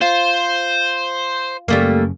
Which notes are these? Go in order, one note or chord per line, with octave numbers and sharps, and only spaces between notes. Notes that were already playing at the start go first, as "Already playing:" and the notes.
F4 C5
F#2 C#3 G3 A3 A#3